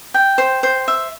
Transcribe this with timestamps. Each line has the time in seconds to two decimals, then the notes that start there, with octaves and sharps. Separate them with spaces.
0.14 G5
0.38 C5
0.63 C5
0.88 E5